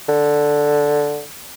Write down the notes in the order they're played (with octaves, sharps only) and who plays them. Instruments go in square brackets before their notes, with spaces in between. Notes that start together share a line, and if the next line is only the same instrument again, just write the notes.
[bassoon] D3